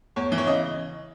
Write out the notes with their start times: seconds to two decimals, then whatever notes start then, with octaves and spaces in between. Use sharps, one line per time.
0.16 E2 C#5
0.32 E3
0.38 C#5
0.47 C#3 D#5